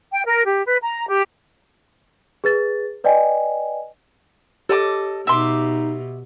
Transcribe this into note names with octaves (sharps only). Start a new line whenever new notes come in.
G5
A#4
G4
B4
A#5
G4
G#4 B4 A6
B4 D5 D#5 G5 G#5
G4 A4 D#5 D6
B2 D#4 E5 C6 D6